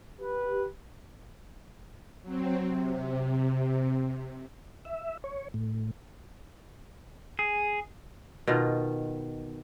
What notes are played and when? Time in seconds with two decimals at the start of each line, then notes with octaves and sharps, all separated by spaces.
0.21 G4 B4
2.22 F#3 C4
2.67 C3
4.85 E5
5.24 C#5
5.54 A2
7.39 G#4
8.47 B2 D#3 F4